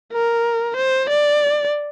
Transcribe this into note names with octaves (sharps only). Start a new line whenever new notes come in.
A#4
C5
D5